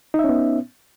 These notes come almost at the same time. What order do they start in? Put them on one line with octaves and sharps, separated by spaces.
D#4 E5 C#4 B3